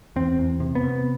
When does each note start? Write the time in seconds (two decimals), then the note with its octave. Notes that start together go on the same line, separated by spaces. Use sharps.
0.16 E2 C4
0.39 E2
0.60 C3
0.75 B3
0.83 C3